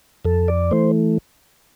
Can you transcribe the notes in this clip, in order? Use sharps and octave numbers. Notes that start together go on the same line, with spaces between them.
F2 A4
D5
E3 A3 C5